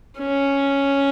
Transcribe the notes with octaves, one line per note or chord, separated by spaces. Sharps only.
C#4